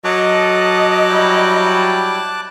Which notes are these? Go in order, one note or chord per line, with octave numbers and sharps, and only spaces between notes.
F#3 A4 D#5 A5 D6 D#6 F#6
G3 E4 G5